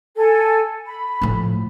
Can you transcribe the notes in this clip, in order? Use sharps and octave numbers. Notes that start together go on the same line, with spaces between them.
A4 G#5
B5
A2 F3